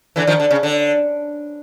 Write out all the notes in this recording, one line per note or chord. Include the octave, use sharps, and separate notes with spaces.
D3 E3
D#3 F3
D3
C#3
D3